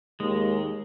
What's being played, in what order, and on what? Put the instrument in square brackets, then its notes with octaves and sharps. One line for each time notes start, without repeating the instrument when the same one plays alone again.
[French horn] D#2 [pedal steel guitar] G#3